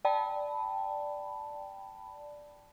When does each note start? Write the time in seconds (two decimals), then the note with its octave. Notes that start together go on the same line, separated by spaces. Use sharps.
0.05 D5 G5 A5 B5